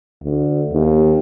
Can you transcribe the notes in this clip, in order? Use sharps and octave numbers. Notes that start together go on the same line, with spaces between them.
D2
D#2